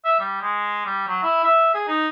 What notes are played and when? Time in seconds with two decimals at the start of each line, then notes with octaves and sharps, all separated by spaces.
0.05 E5
0.19 G3
0.42 G#3
0.86 G3
1.08 F#3
1.23 E4
1.44 E5
1.74 G#4
1.88 D#4